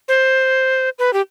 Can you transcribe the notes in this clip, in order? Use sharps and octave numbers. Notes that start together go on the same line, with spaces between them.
C5
B4
G4